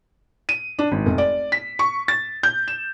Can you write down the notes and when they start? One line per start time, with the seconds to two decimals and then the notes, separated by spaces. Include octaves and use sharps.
0.49 D#7
0.79 D4
0.92 G#1
1.06 F1
1.18 D5
1.52 B6
1.79 C#6
2.08 A6
2.43 G6
2.68 E7